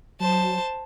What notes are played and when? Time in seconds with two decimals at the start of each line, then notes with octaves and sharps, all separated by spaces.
0.20 F#3 C5 A5